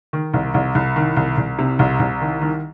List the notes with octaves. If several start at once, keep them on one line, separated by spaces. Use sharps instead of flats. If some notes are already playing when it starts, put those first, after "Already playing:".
D#3
C2
C2
C2
D#3
C2
C2
C3
C2
C2
D#3
D#3